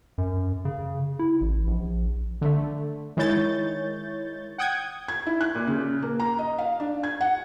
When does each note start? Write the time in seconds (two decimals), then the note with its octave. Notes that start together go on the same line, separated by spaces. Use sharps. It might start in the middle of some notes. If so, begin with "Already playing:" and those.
0.18 F#2
0.65 C#3
1.19 E4
1.41 A1
1.67 A#1
2.41 D3 A3
3.17 D#3 G#3 E4 C#5 G6 A6
4.58 F#5 G5 D#6 G6 G#6
5.08 G#6
5.27 E4
5.41 F#6
5.55 A#2
5.67 C#3
6.02 A#3
6.20 A#5
6.39 D#5
6.58 F5
6.80 D4
7.03 G#6
7.21 F#5